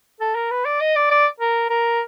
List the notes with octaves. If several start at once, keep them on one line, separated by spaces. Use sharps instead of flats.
A4
A#4
B4
D5
D#5
D5
D5
A#4
A#4